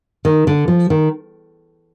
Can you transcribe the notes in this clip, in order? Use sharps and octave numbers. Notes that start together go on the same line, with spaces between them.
D#3
D3
F3
D#3